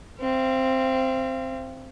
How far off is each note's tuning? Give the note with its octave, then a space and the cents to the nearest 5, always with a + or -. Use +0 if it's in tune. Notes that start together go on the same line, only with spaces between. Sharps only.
C4 +0 F5 -40